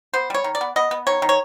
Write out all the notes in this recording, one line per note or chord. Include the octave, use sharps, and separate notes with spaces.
B3 C5
G3 C#5
D#3
D5
B3
B3 D#5
B3
D#3 C#5
D#3
C#5